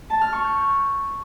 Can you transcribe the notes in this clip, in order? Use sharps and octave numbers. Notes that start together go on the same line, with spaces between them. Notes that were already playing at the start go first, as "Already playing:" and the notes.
A5
F6
C#6
G6